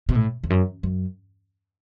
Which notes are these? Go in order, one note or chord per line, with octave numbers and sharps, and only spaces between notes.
B2
A2
E2
F#2
F#2